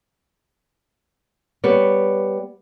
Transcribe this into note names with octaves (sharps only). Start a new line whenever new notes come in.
G3 B3 C#5